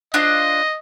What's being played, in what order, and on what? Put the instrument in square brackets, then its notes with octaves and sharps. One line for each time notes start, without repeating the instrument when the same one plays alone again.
[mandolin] D4 F4 C5 [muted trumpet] D#5